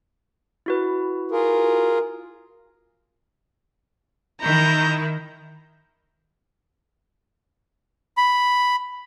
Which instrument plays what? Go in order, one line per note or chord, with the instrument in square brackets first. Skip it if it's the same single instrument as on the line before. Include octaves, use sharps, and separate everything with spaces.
[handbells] E4 F#4 B4
[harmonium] F4 G#4 A#4
[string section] D#3 E4 [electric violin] A#5 G6
[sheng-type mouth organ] B5